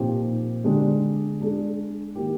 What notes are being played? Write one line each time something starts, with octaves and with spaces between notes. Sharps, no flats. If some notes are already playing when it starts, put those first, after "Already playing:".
Already playing: A#2 F3 C4 D#4 G4
D3 G#3 D4 G4
G#3 D4 G#4
D#3 A#3 D#4 G4